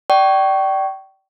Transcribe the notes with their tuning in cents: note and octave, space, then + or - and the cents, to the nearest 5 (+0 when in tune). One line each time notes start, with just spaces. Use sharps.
D5 +10 G5 -30 C#6 +0